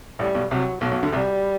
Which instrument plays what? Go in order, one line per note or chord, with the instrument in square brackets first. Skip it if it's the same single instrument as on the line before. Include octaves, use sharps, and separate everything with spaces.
[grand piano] A1 A2 [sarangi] G3
[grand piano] B1 B2
[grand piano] C2 C3 [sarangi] F#3
[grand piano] B1 B2 [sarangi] F#3
[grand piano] B1 B2
D2 D3
[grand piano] C2 C3 [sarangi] G3